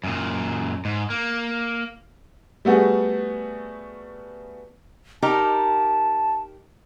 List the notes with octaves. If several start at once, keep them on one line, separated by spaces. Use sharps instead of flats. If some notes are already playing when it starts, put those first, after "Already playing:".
F#2 A#2
G#2
A#3
G3 A3 B3 F#4 G#4
D#4 G4 A#4 A5